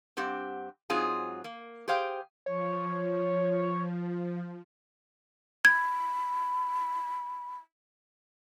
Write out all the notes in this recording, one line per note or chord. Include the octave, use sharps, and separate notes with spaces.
G2 C4 G4 F#5
G#2 F#3 G#3 C4 F4 G#4
A#3
G4 G#4 C5 F5 G5
F3 C#5
B5 G#6